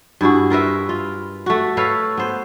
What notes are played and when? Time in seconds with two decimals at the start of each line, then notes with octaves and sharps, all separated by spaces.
0.21 G2 E4 F#4 G#4
0.50 F4 A#4 B4 E5
0.89 F4
1.46 A3 F#4
1.77 A4 B4 C#5 F5
2.18 B3 C5